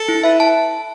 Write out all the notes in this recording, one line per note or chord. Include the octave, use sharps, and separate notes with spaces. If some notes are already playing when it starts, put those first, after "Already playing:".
Already playing: A4
E4
B4 E5
A5